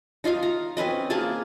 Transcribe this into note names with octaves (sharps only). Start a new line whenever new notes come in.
D#4 F4 D#5 F5
A#5
C4 C#4 B4 D#5
A#3 G#4 A#4 A5